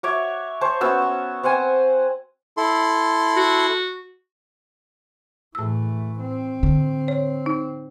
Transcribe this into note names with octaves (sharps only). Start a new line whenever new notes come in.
F#4 C#5 D5 E5
C5 C#5 A5
B3 C#4 F#4 E6
E6
C4 C5 F#5 G#5
E4 A4 C6
F#4
A2 E3 A3 E6
C4
D3
C#5
D#4